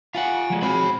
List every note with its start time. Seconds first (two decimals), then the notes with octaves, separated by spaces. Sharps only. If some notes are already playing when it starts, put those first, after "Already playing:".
0.15 F4 F5 F#5 G#5
0.50 F3 G#3 F#4
0.62 C4 F#4 G#4 C#5 B5